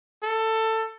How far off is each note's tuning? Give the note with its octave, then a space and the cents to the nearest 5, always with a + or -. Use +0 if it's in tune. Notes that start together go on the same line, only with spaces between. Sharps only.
A4 +15